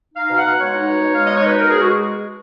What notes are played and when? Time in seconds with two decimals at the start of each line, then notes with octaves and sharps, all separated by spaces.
0.14 D#4 F5
0.30 B2
0.36 F#5
0.44 B2
0.59 G#3 C#5
0.73 D#4
0.88 B2
1.02 B2
1.15 G#3 F5
1.25 D#5
1.33 D#4 C#5
1.46 B2 B4
1.58 B2 A#4
1.69 G#4
1.76 G#3 F#4